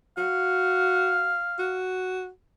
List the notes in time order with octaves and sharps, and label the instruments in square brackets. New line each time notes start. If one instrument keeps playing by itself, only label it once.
[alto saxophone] F#4 [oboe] F5
[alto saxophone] F#4